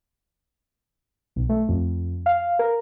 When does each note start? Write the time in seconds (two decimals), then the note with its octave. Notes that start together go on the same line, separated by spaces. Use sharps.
1.36 B1
1.49 A3
1.69 F2
2.26 F5
2.59 A#4